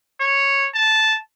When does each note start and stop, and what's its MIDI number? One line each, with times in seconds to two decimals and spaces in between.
0.20 0.67 73
0.74 1.17 81